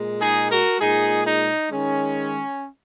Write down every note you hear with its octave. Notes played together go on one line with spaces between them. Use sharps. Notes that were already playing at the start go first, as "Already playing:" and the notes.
Already playing: A#2 G#3
D#4 G#4
F#4 A#4
A#2 G#3 D#4 G#4
D#4
D#3 G#3 C#4